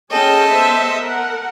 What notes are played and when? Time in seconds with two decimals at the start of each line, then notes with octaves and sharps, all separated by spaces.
0.11 C#4 G#4 A4 D#5 G5
0.50 B3 C5 E5
1.00 A#4 F#5